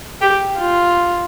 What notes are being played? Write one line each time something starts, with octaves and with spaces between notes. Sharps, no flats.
G4
F4